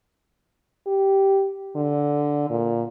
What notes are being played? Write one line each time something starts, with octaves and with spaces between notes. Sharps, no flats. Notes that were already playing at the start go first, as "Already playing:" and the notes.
G4
D3
A#2